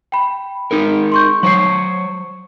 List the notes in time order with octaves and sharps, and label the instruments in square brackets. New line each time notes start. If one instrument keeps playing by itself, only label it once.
[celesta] G5 B5
[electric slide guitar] D#4 G#4 A#4
[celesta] C6 C#6 G6
[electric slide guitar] F#3 C5 C#5 [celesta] C#6 C7